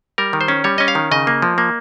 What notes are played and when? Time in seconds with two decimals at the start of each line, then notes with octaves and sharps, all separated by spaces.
0.18 G3 A#4
0.33 D#3
0.41 C5
0.48 C#4
0.64 G3 C#5
0.78 C#4 D#5
0.88 F5
0.95 D#3
1.11 C#3 D#5
1.27 A#3
1.42 F3
1.58 A#3